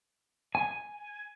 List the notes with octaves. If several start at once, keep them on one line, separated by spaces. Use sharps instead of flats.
G#5